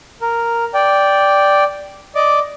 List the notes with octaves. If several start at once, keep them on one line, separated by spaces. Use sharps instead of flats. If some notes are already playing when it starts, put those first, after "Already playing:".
A#4
D5 G5
D5 D#5 D6